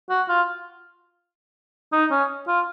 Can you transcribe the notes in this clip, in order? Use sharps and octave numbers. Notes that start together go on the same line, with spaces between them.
F#4
F4
D#4
C#4
F4